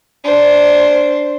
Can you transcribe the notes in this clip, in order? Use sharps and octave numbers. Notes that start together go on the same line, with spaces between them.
D4 C5